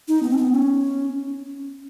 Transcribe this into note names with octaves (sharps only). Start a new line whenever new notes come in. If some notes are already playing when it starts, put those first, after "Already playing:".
D#4
B3
C4
B3
C#4